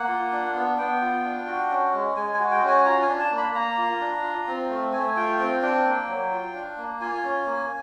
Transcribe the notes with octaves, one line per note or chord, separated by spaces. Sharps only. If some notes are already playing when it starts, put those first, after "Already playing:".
Already playing: A#3 F#5
F4
D4
B3
B3 G5
F4
D4
F#4
C#4
G#3
G#3 G#5
G#5
F#4
G5
C#4
G#5
F4 A#5
G#5
D4
A5
A#3
B5
A#3 A#5
F4
D4
F4
C4
A3
A3 G#5
F4 G5
C4 G5
D4 G5
A#3
F#3
F4
D4
A#3
F4 G#5
C#4
A#3